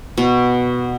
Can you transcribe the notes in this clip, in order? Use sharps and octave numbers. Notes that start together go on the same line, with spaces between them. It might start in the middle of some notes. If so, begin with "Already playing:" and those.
B2